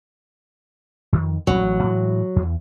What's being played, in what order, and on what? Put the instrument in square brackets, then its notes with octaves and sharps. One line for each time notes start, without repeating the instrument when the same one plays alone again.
[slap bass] F2 D#3
[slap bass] D#1 C2 C#4 [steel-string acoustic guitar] F#3
[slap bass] A1
A2 E3 G#3
E2